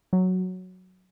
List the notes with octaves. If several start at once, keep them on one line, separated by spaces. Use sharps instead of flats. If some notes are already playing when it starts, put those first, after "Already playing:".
F#3